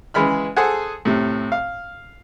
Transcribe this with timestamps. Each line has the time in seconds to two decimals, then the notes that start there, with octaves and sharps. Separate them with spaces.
0.14 C#3 E3 G#3 B5 F6
0.56 G#4 A4 C5 F#5 G#5
1.05 A2 C3
1.52 F5